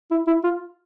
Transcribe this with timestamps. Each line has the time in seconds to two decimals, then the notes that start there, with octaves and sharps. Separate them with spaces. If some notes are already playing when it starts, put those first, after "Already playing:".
0.11 E4
0.27 E4
0.44 F4